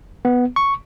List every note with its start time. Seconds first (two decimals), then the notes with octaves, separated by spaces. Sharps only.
0.25 B3
0.56 C#6